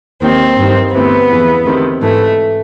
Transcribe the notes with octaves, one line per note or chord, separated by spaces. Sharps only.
D#2 D#3 C4
G2 D#3
D2 C3 E3 B3
E2 C#3 E3
D2 C3 D#3
G#2 E3 A3